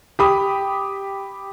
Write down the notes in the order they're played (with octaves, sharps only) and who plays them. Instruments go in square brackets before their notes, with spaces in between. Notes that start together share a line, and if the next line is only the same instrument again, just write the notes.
[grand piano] G4 B5 D#6